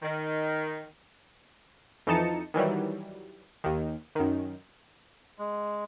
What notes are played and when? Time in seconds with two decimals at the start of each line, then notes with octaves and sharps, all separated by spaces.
0.03 D#3
2.07 F2 E3 D#4 A5 C#7
2.54 D#3 E3 F#3 G3
3.64 D#2 D#3
4.15 F#2 D#3
5.39 G#3